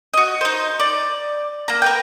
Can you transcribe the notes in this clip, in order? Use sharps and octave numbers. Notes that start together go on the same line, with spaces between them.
F#4 D#5
D#4 C5
D5
A#3 A#5
A#4 B4 G5